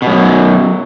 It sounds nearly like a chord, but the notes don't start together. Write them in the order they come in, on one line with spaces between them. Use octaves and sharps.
B2 F#2 F#3